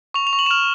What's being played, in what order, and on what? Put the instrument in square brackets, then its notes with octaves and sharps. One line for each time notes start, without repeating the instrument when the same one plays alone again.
[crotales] C#6 F7
F7
C#6
F#7
E7
F6 F7